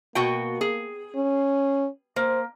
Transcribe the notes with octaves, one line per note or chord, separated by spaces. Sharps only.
B2 A#3 F#4 G5
G#4
C#4
A#3 C5